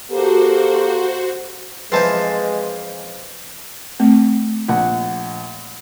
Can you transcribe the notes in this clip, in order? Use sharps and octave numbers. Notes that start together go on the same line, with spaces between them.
A#3 F#4 G4 A4 C5
F2 E3 F3 G#3 B4 C5 A5
A3 C4
A#1 F#5